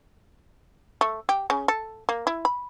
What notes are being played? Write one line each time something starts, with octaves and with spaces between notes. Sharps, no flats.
A3
G4
C#3
A4
A#3
E4
B5